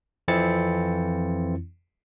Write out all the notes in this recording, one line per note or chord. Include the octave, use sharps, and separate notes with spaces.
F2 E3 C4 E4 A6 C#7